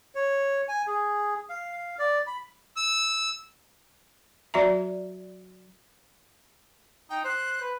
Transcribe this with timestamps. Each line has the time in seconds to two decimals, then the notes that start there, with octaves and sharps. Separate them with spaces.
0.15 C#5
0.68 G#5
0.87 G#4
1.49 F5
1.99 D5
2.27 B5
2.77 E6
4.54 F#3 F#4 D5 E5 A#5
7.10 D#4 G5
7.25 C5 F#6
7.61 B4